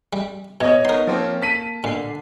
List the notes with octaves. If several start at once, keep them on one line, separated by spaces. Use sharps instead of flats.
G3
B2 C#5 D#5 G#6
B3 D#4 A#4 C6
F3 A#3 C4 C#4
A5 B6 D#7
A#2 D3 C7